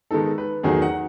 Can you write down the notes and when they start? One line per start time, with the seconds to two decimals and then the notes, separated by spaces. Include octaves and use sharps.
0.11 D#3 G#3 B3 D#4 A4
0.38 B4
0.63 E2 D#3 F#3 A3 D#4 G#4
0.82 F#5